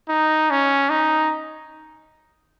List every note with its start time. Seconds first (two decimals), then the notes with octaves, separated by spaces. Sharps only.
0.09 D#4
0.50 C#4
0.90 D#4